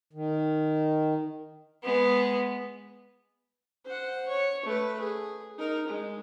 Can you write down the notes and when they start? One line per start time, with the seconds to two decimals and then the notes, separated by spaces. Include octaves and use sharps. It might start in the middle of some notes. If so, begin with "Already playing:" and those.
0.13 D#3
1.83 G#3 B3
3.85 C5 F#5
4.28 C#5
4.65 A3 B4
5.01 G#4
5.58 D#4 A#4
5.87 G#3